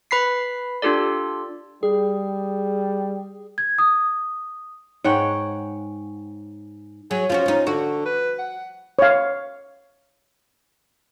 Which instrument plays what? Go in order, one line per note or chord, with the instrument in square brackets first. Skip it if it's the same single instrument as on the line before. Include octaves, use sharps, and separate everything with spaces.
[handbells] B4 B5 B6 C7
D4 F4 G4 A4 D5
[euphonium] G3 [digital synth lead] G#4
[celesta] G#6
D#6
[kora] G#2 C#5 F#5 G5
[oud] F#3 [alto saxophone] G#4
[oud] F3 C#4 F#4 [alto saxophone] F4
[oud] C#4 D#4
[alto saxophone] D3 [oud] F#4
[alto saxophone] B4
F#5
[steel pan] C#5 F5